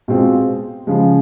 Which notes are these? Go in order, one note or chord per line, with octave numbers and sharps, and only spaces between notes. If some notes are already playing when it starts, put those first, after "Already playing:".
B2 G#3 C4 F4
C#3 F3 G#3